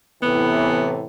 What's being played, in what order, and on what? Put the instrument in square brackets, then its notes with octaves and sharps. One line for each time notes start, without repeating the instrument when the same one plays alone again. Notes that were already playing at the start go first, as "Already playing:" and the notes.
[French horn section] A2 C3 E3 [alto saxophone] B3